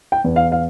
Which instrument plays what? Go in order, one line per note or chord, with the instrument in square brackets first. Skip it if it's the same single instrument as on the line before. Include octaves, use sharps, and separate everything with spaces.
[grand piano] G5
E2
F5
F5